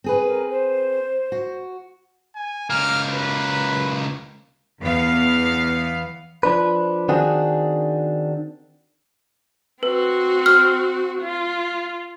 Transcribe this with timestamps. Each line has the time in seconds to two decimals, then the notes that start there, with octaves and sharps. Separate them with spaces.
0.04 C4 G#4 B4
0.24 A#4
0.50 C5
1.32 F#4
2.36 G#5
2.70 C#2 A#3 F6
3.09 B4
4.81 E2 B3 F5
6.43 F3 D4 B4
7.09 D#3 C4 D4 F#4 G#4
9.83 C4 F#4 B4
10.46 F6
11.22 F4